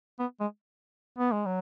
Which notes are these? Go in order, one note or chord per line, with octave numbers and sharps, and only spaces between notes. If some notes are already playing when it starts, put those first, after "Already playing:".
B3
G#3
B3
G#3
F#3